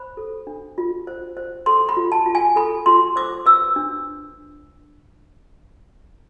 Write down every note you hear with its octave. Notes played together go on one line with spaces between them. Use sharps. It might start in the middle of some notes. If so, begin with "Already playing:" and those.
Already playing: C5 B5
A4
D4
F4
C5
C5
A4 C6
B5
F4
A5
F4
G#5
A4 B5
F4 C6
C5 D6
B4 E6
D4